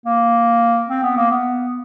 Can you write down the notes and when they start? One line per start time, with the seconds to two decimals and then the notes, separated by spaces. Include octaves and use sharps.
0.06 A#3
0.89 C4
1.03 B3
1.17 A#3
1.31 B3